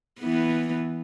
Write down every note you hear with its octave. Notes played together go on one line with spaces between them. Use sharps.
E3 B3